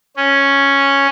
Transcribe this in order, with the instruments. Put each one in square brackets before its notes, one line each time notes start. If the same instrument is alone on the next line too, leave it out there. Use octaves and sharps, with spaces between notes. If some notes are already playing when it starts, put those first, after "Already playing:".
[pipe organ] C#4